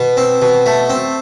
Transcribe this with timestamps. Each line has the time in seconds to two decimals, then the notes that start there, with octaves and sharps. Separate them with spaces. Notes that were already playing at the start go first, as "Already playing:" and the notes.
Already playing: B2
0.17 C4
0.42 B2
0.66 A3
0.90 C4